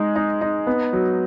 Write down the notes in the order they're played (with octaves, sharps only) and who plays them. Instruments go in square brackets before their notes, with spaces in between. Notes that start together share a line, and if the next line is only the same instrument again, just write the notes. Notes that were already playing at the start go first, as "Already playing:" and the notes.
Already playing: [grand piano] G#3 D#4
D#4
D#4
B3
F#3